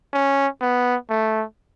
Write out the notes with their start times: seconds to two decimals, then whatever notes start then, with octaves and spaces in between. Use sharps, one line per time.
0.13 C#4
0.61 B3
1.10 A3